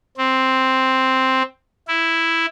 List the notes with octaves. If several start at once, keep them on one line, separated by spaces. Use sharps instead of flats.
C4
E4